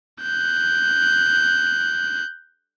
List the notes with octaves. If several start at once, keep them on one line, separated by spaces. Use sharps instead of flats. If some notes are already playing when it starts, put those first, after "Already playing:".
F#6 G6